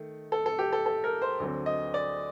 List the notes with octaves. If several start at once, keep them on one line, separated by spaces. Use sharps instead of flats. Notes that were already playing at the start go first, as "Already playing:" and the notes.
Already playing: D#3 A3
A4
A4
G4
A4
A4
A#4
C5
D2 D3 F#3 C4
D#5
D5